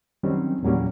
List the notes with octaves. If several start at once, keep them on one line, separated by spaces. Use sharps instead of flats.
D#3 F#3 G3 C4 C#4
E2 A#2 F#3 G3 A#3 C#4